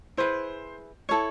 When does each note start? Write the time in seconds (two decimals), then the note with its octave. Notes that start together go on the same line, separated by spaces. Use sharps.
0.17 E4 G#4 B4 C5
1.09 E4 A4 C#5